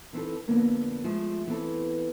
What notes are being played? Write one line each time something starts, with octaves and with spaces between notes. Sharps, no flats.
E3 C4 C#4 D#4 A4
F2 D3 A#3 B3 A#4 C#5
F3 G#3 A3 G#4
E3 B3 C4 A4